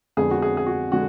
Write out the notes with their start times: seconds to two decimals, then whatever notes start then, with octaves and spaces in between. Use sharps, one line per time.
0.17 F2 D3 G#3 B3 G#4
0.31 F#4
0.42 G#4
0.57 G#4
0.66 F#4
0.92 D3 G#3 F#4